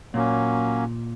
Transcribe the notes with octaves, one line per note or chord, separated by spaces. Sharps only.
A#2 F#3 A#3 C#4